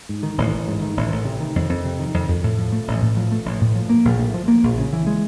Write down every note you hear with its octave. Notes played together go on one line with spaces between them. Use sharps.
G#2
D#3
A1
A1
G#2
D#3
A1
A1
C3
D#3
F2
F2
C3
D#3
F2
F2
A2
F3
A3
A1
A2
F3
A3
A1
A2
F3
A#3
A#1
A2
F3
A#3
A#1
C#3
E3
G#3